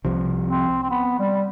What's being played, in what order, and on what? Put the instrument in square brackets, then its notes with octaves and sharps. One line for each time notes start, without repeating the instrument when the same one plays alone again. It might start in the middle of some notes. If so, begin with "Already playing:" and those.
[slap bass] C2 C3 F3
[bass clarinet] C4
C4
B3
G3